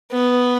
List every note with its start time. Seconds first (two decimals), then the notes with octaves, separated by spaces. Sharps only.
0.12 B3